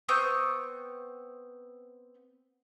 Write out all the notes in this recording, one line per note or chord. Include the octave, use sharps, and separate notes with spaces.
B3 C4 C#6 G6